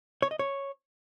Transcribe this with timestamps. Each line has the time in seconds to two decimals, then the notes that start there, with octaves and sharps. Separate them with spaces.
0.22 C#5
0.31 D#5
0.39 C#5